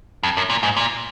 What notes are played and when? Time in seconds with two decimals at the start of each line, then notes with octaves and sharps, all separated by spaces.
0.23 F2
0.37 F#2
0.50 A#2
0.63 G#2
0.77 A#2